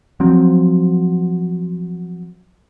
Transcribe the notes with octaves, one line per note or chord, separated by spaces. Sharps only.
F3 F#3 C4